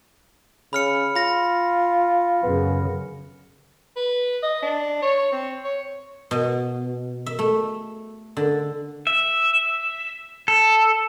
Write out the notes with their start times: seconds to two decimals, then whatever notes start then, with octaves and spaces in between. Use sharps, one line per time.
0.73 C#3 B5 F6 C#7
1.15 F4 B5 A#6
2.43 F#2 C#3 B3
3.96 B4
4.43 D#5
4.62 D4
5.02 C#5
5.32 C4
5.64 C#5
6.31 B2
7.26 E5
7.39 A3
8.37 D3
9.07 E5
10.48 A4